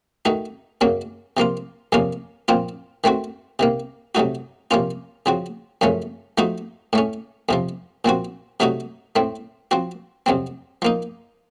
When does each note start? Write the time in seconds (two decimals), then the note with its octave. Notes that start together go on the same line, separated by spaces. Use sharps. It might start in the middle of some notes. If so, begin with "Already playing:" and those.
0.25 D#3 A3 D#4 F#4
0.81 F#2 C#3 F#3 A#3
1.37 C3 F3 A#3 F4
1.92 F2 C3 F3 A#3 C#4
2.48 A#2 F3 C4 F4
3.04 D#3 A3 C4 F#4
3.59 C3 D#3 A#3
4.15 C3 F#3 A3 D#4 F#4
4.71 C3 F3 A#3 C#4 F4
5.26 C#3 F3 C4 F#4
5.81 F#2 C#3 F3 A3 C#4
6.38 F3 A3 D#4 F#4
6.93 A2 A3 C#4
7.49 F2 C3 F3
8.05 A#2 F3 C4 F#4
8.60 C3 F#3 A3 D#4 F#4
9.16 A2 A3 C4
9.71 F3 C4 F#4
10.26 F2 C3 F#3 C4
10.82 F3 A#3 D#4